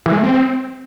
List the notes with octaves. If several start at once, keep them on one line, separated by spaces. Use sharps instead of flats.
E3
G#3
A3
C4